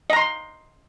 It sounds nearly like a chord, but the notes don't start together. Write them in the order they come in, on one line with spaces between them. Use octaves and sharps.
D#5 A#5 C6